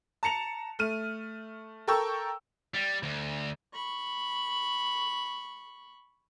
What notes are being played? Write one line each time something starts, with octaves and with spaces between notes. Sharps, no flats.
A5 A#5 C#7 F7
A3 F6 D#7
A4 A#4 G5 C#6 E6
G3
D2
B5 C#6